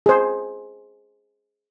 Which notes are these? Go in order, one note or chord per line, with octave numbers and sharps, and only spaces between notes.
G#4 C5